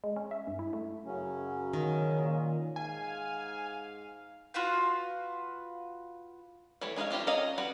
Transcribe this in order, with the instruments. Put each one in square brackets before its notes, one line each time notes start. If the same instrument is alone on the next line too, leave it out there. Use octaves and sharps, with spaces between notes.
[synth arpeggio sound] G#3
C#4
E5
G2
E4
A3
[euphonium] F#2 [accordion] C#3 F#3 C#4
[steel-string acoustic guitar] D#3
[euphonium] A#2
[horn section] G#2 F5 [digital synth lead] G#5
[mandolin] F4 F#4 B4 F5
[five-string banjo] E3 G3 A3 C#5
G#3 D#4 B4 C#5 F5
D4 F4 G4 C5
C#4 D5 D#5 F5 A#5
G3 F#4 B4